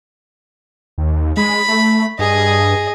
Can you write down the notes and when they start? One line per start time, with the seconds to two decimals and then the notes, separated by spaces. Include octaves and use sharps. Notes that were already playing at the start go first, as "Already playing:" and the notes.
0.98 D#2
1.37 G#3 B5
1.68 A3
2.19 G2 G#4 D#5